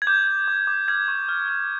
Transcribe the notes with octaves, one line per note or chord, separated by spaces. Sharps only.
G#6
D6 G6
G6
D6
D6
F6 G#6
C#6
F6
F6